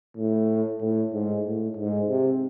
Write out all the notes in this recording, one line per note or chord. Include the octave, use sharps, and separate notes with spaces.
A2
A2
G#2
A2
G#2
C3